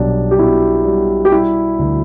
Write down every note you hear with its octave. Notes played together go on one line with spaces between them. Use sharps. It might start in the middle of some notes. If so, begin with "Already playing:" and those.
Already playing: B1 G3 D4
G4
B2 E4
G3
G4
G3 E4
D2